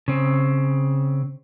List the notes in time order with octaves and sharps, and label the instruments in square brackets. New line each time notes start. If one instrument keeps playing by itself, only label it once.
[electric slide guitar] C#3 C4